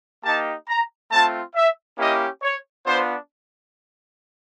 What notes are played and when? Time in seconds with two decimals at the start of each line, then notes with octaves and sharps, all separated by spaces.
0.24 A#3 D#4 G4 A5
0.68 A#5
1.11 A3 C4 F4 A5
1.55 E5
1.98 A#3 C#4 E4 G4 D#5
2.42 C#5
2.86 B3 D4 F4 C5